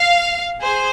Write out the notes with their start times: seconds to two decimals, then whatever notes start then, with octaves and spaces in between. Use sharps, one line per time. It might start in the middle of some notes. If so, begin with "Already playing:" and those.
Already playing: F5
0.62 G#4 C5